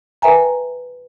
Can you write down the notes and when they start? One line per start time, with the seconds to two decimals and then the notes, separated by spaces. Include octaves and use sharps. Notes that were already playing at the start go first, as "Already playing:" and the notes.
0.22 A#4 B4 E5 G5 G#5 A#5